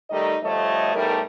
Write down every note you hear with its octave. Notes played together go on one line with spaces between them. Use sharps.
D#3 G3 A3 D#4 G4 D#5
D2 F3 G3 A3 C#5 D#5
E2 A2 G3 A3 D#4 A#4